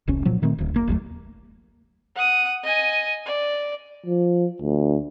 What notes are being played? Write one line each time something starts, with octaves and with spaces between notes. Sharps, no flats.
E1 C2 C#4
A#2 F3 F#3
A#2 D#3 A3 C4
D1 D2
F#1 A#3
F#1 D#2 F#3 A3
F#5 D#6
D#5 G#5
D5
F3
D2